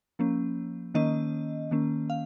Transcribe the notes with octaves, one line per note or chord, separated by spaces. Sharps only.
F3 A#3 C#4
D#3 A#3 C#4 D#5
D#3 A#3 C#4
F5